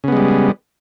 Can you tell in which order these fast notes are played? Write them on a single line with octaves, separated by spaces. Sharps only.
C#3 B3 G#3 G3